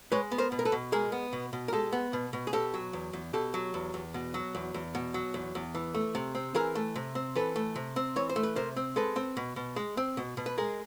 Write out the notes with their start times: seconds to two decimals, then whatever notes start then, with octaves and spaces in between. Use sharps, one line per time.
0.12 G#3 B4 C#5
0.32 B3
0.38 A#4 C5
0.52 B2
0.59 A#4
0.65 A4 B4
0.72 B2
0.92 G#3 G#4 A#4
1.12 B3
1.33 B2
1.53 B2
1.68 A#4
1.73 G#3 G4 A4
1.93 B3
2.13 B2
2.33 B2
2.47 G#4
2.53 B2 G4 A4
2.74 F#3
2.93 E2
3.13 E2
3.33 B2 G4 A4
3.54 F#3
3.74 E2
3.94 E2
4.14 B2
4.34 F#3
4.55 E2
4.74 E2
4.95 B2
5.14 F#3
5.34 E2
5.55 E2
5.75 E3
5.94 A3
6.15 C3
6.35 C4
6.55 E3 G#4 A#4
6.75 A3
6.96 C3
7.15 C4
7.35 E3 A4 B4
7.56 A3
7.76 C3
7.96 C4
8.16 E3 C#5
8.29 C5
8.36 A3
8.43 B4
8.56 C3 A#4 C5
8.76 C4
8.96 G#3 A4 B4
9.16 C4
9.37 B2
9.56 B2
9.76 G#3
9.97 C4
10.17 B2
10.37 B2
10.46 B4
10.58 G#3 G#4 A#4